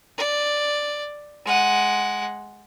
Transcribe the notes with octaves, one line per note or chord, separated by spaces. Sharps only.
D5
G#3 F#5